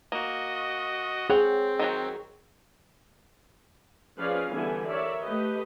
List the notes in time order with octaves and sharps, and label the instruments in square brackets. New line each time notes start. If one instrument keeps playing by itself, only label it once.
[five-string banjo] A#3 [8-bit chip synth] F#4 D#5
[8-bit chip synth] C4 [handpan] G#4 [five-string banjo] C#5 F#5 G5
[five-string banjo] D#3 F#3 F#4
[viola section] F3 C#4 G#4 B4 D5 F5
D3 E3 G3 B3 E4 G#5
A#4 C#5 D5 E5
A3 G4 B4 D#5